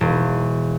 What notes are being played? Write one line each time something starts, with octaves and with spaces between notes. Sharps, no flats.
E1